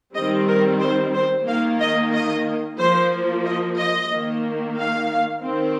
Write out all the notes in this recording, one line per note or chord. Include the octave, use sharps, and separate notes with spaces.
D#3 G3 C4 D#5
A#4
C5
C5
D#3 A#3 F5
D#5
D#5
F3 A#3 C5
D#5
D#5
D#3 A#3
F5
D#3 C4